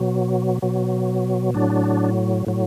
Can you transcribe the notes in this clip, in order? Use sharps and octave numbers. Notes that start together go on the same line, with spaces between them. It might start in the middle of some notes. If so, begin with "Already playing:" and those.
Already playing: B2 F#3
B2 F#3
A2 F#3 D4
A2 F#3